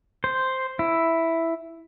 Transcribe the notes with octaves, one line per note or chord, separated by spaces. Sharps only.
C5
E4